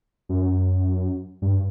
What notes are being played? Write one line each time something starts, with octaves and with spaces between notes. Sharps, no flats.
F#2
G2